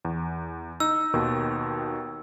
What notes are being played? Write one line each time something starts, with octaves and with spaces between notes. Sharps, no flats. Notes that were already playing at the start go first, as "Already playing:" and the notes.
E2
D#4 E6
D#2 B2 D#3